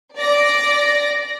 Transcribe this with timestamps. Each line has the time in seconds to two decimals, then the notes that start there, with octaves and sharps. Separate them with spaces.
0.15 D5 A#6